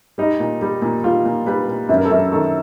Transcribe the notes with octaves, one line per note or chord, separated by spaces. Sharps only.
G3 D#4
A#2
G3
A#2
G3 F4
A#2
G3 B4
A#2
F#2 B4
A#4
A4
F#2 A#4
D#3 A4